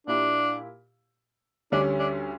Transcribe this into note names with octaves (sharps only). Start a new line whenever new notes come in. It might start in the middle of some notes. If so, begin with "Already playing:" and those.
A#2 A#3 D4 E4 G4
D2 D3 G3 C#4 D4
D4